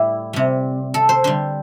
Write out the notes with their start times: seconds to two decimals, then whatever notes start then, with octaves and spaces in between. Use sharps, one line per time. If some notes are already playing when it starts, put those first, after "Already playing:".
Already playing: A2 G3 E4 G4
0.33 C3 G3
0.94 A4
1.09 C5
1.24 D3 G3 C5